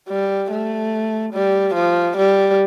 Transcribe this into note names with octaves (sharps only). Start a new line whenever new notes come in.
G3
A3
G3
F3
G3